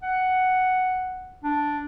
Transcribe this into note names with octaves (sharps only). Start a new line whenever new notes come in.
F#5
D4